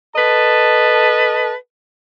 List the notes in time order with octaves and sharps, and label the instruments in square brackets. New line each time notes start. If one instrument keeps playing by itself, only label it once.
[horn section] A4 B4 D#5 A5